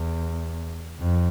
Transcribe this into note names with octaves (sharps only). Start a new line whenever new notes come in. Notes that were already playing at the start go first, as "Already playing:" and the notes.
Already playing: E2
F2